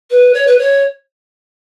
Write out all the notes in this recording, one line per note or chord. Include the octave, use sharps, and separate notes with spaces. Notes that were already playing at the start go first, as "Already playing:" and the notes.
B4
C#5
B4
C#5